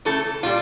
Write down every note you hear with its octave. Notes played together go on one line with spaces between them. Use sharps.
C#3 E3 A3 A4
A#2 G3 F4